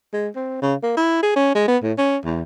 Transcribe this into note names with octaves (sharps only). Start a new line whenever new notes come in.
G#3
C4
C#3
A#3
E4
G#4
C#4
G#3
B3
A2
C#4
E2